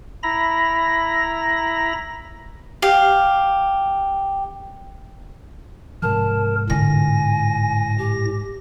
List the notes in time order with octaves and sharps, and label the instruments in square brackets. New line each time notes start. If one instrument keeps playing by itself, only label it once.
[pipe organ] E4 A#5 B5 A#6
[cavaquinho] G4 F5
[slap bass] G#2 C3 F3 [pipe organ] A#4 [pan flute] A5
[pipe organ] A2 A#6 [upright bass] D3 F4 [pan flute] G#5
[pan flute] G4